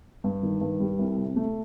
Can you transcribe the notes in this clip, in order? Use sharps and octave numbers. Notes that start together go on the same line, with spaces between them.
G2
D#3
G2
G3
C2
C3
A3